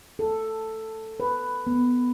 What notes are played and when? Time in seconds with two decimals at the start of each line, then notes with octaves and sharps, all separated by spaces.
0.19 A4
1.20 B4
1.67 B3